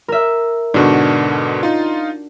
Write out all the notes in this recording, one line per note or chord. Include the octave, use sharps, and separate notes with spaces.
A#4 E5
G#2 B2 D3 D4 F#4
D#4 F4